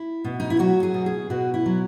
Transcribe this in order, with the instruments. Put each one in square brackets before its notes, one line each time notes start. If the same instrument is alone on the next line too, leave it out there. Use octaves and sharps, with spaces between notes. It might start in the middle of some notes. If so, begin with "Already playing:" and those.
Already playing: [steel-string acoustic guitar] E4
B2
D#4
E4
F#3 F#4
G#4
B2
G#4
B2 F#4
E4
F#3